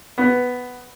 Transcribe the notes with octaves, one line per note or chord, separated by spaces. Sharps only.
B3